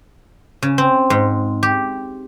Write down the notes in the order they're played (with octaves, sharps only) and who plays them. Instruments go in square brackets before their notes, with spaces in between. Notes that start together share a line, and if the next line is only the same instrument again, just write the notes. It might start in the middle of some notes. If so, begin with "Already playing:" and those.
[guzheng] C#3
C4
G#2
G4